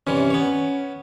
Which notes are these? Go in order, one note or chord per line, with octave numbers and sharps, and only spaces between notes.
G2 C3 E3 C#4
B3 C#5